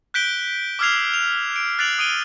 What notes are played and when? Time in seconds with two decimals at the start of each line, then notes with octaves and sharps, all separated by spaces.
0.14 F#6 G6 B6 D7 G7
0.79 D6 E6 F6 G#6 C7 F7
1.14 F7
1.56 D7
1.79 F#6 A6 C7 D7 F7 F#7
1.99 D#6 D7 D#7 G7